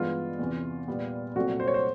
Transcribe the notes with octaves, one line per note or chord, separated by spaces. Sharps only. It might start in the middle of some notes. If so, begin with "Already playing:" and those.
Already playing: G2 E3 G#3 B3 F4
E2 C3 E3
A#2 G3 B3
C2 A#2 F#3 A3 C4 F#4
C5
C#5
C5